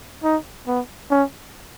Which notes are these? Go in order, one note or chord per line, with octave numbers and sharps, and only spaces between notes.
D#4
B3
C#4